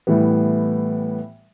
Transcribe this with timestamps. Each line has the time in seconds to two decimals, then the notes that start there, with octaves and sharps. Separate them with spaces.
0.07 A2 E3 G3 B3